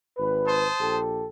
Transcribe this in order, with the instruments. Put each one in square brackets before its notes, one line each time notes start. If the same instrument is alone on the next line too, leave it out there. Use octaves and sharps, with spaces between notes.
[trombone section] G#1 B4
[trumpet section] C5 A5 D#6
[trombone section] A#1 G4 A4